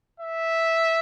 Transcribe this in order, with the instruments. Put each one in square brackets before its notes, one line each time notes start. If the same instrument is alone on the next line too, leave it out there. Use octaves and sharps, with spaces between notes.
[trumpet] E5